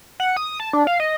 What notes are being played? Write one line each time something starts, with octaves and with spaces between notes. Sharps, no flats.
F#5
D#6
A5
D4
F5
D#5